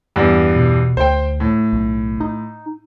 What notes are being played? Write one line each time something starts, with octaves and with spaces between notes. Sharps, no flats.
E2 G2
B2
D2 C5 G5
A2
B1
D#4